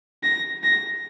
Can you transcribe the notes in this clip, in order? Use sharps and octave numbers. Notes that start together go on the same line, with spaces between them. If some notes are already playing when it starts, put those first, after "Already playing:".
A#6
A#6